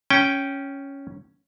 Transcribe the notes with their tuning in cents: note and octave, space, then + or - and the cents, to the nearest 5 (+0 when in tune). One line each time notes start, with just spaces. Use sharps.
C#4 +0 G5 -5